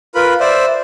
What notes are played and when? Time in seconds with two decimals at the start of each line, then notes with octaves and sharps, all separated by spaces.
0.15 F4 A#4 B4 B5
0.40 C5 D5 E5